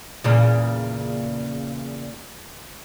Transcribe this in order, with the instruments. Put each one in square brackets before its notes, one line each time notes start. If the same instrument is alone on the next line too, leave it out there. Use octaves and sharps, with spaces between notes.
[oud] E2 A#2 C#3